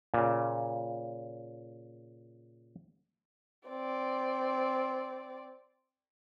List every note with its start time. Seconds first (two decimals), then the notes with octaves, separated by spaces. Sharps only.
0.14 A#2 C#3
3.69 C4 D5